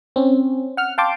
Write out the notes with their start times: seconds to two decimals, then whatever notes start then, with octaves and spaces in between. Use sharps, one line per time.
0.16 C4 C#4
0.77 F#5 F6
0.98 F5 G5 A5 C6 D6